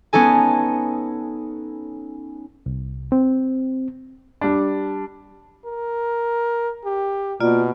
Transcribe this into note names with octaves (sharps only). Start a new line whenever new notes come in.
B3 C#4 D#4 A4 G#5
C2
C4
G3 D4
A#4
G4
B2 A#3 F4 D5